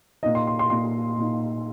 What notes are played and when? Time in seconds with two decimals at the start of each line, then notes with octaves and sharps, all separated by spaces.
0.23 A#2 A#3 D#4 D#5
0.35 C6
0.47 C6
0.59 C6
0.70 A#2 A#3 D#4 C6
1.17 A#2 A#3 D#4